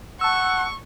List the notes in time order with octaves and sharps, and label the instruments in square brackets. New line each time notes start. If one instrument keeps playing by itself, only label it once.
[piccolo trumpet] F#5 [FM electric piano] A5 E6 [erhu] C#6